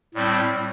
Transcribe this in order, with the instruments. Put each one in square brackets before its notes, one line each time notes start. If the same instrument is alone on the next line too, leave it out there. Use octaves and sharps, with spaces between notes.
[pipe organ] A2 G3 C4